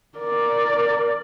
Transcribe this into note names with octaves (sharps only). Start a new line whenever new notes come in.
A#4 D5